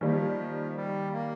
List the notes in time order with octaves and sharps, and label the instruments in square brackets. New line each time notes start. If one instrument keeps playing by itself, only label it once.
[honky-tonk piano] D#3 G3 A#3 [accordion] F3
[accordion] G3
A#3